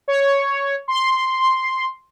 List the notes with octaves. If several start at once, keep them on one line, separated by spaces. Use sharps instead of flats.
C#5
C6